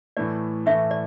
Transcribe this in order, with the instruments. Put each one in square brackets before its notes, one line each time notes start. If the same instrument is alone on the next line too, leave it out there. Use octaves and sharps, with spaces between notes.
[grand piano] A2 E3 A3 [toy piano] D5
[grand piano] A2 E3 A3 [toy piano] E5
[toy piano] D5